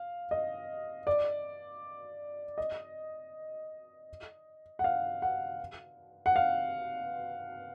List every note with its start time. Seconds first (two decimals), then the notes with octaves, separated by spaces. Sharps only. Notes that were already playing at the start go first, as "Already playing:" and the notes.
Already playing: F5
0.31 D#5
1.07 D5
2.58 D#5
4.79 F#5
4.84 F5
5.22 F#5
6.26 F#5
6.36 F5